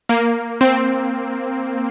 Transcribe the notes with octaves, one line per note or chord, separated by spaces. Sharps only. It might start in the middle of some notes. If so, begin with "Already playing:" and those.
A#3
C4